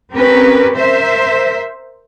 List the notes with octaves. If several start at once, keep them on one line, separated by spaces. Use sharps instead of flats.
C4 C#4 G4 A#4 B4
A#4 C5 E5